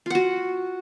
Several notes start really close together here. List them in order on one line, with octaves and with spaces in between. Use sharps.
F4 F#5 F#4